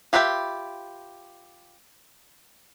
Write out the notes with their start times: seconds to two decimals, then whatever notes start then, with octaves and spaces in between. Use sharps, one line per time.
0.13 F4 G4 B4 E5 G5